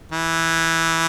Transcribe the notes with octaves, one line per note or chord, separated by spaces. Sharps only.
E3